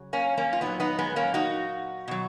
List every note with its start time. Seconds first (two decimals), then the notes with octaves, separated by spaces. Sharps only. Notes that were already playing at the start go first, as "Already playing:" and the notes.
Already playing: C#3 F#3
0.13 A#3 C#4
0.37 A#3 C#4
0.53 F4
0.61 A#2 F#3 B3 D#4
0.80 B3 D#4
0.99 G#3 B3
1.16 A#3 C#4
1.34 D#4 F#4
2.08 B2 F#3